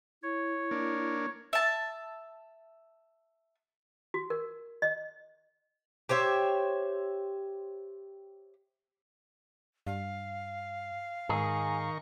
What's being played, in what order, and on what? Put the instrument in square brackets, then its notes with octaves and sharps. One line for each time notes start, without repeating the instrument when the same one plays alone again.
[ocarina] E4 [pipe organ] C#5
[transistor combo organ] A#3 D4
[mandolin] E5 A5
[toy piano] F#4
A#4
D#5
[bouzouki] G4 C5 C#5 E5
[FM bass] G2 [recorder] F5
[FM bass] G#2 [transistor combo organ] D#3 A#4 C#6 [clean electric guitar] G#4